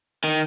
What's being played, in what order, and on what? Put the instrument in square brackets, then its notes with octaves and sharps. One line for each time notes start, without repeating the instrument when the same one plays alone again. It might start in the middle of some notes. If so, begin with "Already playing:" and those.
[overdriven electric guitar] D#3